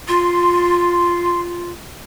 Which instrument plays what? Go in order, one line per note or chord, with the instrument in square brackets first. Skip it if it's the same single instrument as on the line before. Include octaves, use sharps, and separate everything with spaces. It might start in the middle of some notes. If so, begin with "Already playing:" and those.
[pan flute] F4 [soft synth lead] C6